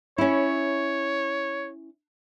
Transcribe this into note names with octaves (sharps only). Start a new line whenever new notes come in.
C#4 E4 C#5